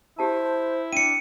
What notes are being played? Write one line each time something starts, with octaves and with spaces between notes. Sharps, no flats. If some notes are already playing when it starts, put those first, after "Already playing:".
E4 G4 C5 A5
D4 G5 C#7 D#7